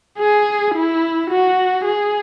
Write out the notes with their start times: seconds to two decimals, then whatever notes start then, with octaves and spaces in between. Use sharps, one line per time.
0.19 G#4
0.74 E4
1.30 F#4
1.85 G#4